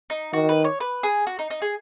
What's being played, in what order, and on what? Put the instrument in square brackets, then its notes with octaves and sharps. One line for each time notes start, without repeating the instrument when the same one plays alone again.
[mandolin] D#4
[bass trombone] D#3 [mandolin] F#4
[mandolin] B4
C#5
B4
G#4
F#4
D#4
D#4
G#4